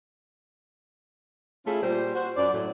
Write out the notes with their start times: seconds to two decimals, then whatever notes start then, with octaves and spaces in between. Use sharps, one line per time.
1.66 A3 C#4 E4 F4 G#4
1.83 A#2 G3 C5
2.15 F#4 C5
2.37 F#2 F#3 D5
2.54 A2 F#3